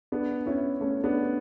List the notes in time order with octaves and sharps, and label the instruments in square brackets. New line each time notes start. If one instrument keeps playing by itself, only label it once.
[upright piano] B3 D4
C#4 E4
A3 C#4
B3 D4